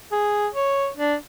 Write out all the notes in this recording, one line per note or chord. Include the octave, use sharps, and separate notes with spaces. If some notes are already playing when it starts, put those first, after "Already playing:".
G#4
C#5
D4